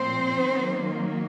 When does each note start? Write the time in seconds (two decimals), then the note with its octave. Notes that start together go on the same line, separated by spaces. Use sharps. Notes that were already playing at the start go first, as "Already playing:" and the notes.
Already playing: A#2 F3 C4 C5
0.45 D#3 F#3 A#3